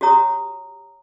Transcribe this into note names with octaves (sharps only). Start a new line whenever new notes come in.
F#4 G4 C#5 A#5 D#6